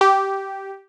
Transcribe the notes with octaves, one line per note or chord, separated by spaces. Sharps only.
G4